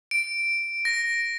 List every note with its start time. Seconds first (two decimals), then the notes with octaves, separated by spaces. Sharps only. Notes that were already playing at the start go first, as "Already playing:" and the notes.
0.11 D7
0.85 A#6